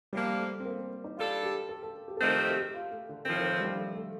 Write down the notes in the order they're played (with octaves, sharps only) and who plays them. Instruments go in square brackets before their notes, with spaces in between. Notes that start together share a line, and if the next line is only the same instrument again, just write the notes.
[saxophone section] C3 F3 A#3 D4 [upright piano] G3
[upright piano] A3
C4
A#3
C4
D#4
[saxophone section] G3 D4 A4 [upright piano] F4
[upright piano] G4
A4
A4
G4
A4
[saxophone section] F2 C3 D#3 A3 C4 [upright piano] A#4
[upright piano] A4
G4
G4
F4
A3
D3
[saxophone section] A2 F3 C4 [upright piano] D#3
[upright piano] D#3
D#3
G3
F3
A3
A3